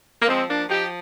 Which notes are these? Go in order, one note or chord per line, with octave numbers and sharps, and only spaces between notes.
A#3
F3 G#3 C4
A#3 D4
F3 D#4 G4